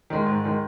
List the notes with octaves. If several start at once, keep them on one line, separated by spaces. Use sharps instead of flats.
D#3 G#3
G#2
D#3 G#3